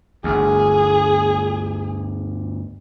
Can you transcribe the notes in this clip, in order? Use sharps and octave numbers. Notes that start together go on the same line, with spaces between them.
G1 D2 G#4